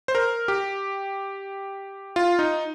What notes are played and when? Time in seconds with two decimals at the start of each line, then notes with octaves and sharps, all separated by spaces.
0.08 C5
0.15 A#4
0.48 G4
2.16 F4
2.39 D#4